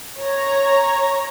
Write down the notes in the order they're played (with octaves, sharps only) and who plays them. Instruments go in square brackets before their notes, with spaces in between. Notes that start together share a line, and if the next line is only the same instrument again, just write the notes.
[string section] C#5 A#5